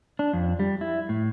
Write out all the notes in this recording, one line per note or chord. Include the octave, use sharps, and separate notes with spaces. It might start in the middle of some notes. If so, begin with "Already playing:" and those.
D4
F2
G3
E4
A2